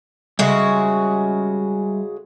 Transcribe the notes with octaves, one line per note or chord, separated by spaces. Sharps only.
C#3 G3 G#3 F#4 E5